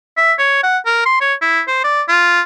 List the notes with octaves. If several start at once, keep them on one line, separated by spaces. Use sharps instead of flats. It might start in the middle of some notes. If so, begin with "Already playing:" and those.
E5
C#5
F#5
A#4
C6
C#5
E4
C5
D5
F4